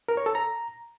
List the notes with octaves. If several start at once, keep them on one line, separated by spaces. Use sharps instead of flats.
A#4
C#5
A4
A#5